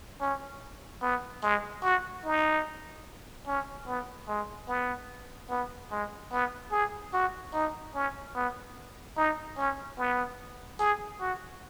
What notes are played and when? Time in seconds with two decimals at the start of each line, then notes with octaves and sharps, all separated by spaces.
0.21 C#4
1.02 B3
1.43 G#3
1.84 F#4
2.25 D#4
3.47 C#4
3.87 B3
4.28 G#3
4.68 B3
5.50 B3
5.91 G#3
6.32 B3
6.72 G#4
7.13 F#4
7.53 D#4
7.95 C#4
8.35 B3
9.17 D#4
9.57 C#4
9.98 B3
10.80 G#4
11.20 F#4